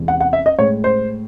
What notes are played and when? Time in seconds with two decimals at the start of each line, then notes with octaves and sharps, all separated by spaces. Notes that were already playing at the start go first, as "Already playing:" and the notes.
Already playing: E2 C3 E3 G#3
0.08 F#5
0.21 F#5
0.33 E5
0.46 D#5
0.58 A2 G#3 C#5
0.84 C5